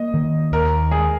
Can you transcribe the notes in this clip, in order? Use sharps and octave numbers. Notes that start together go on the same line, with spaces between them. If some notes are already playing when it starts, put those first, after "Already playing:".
Already playing: A#3 D#5
D#3
D#2 A#4
G#3 G#4